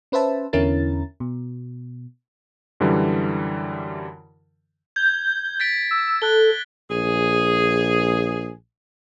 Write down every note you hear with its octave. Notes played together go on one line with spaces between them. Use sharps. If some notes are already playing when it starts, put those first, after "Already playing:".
C#4 B4 C5 E5 A5
E2 D3 C#4 E4 A#4 A6
B2
F#2 D3 E3 G3
G6 G#6
A6 B6 D7
E6
A4 F#6 G7
A#1 G#4